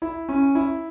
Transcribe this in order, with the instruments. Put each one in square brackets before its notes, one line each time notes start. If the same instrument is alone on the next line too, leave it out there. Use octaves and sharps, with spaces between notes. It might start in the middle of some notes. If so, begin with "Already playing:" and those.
[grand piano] E4
C#4
E4